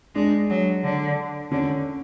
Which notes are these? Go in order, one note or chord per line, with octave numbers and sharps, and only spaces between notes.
G#3 D4
F#3
D3
D3 C#4